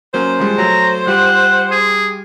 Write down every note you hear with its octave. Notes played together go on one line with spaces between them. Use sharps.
F#3 A#3 C#4 C5
F3 G3 G#3
F#3 A3 A#5
G3 F4 G4 F#5
G#4